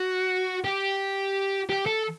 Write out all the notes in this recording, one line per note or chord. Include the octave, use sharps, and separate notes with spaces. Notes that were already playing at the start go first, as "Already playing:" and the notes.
Already playing: F#4
G4
G4
A4